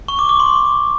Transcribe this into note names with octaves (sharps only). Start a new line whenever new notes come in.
C#6
D6
D6
C6